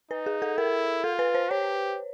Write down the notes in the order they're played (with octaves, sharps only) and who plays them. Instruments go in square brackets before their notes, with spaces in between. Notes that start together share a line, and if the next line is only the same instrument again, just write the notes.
[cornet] D#4 [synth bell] B4
[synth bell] G#4
A4
[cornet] E4 [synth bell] A#4
[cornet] F4 [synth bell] A4
[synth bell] B4
C5
[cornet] G4 [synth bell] C#5